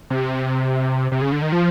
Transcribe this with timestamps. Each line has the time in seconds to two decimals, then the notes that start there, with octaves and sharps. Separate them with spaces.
0.10 C3
1.12 C3
1.21 C#3
1.32 D3
1.42 D#3
1.52 F3